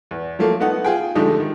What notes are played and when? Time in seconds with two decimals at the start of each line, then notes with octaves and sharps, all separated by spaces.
0.11 E2
0.39 F3 F#3 A3 A#3
0.60 A3 B3 D#4 F#5
0.85 F4 G#4 G5
1.15 D3 F3 G#3 A3 D#4 G4
1.40 D#3